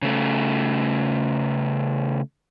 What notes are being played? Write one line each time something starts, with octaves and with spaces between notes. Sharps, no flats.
C#3 A3